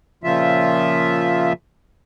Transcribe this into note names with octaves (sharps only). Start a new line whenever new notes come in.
A#2 C#3 F3 F4 E5